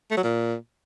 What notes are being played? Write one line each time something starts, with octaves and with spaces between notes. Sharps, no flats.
A3
F#3
A#2